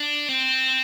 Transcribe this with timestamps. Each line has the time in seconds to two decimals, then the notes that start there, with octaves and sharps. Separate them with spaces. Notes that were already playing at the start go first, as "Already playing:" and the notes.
Already playing: D4
0.29 C4